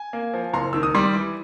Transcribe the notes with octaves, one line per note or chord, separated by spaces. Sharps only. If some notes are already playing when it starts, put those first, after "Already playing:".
Already playing: G#5
A#3
F3
F#1 A#5 C6
D#3 E6
D#6
G3 C6 D6
E3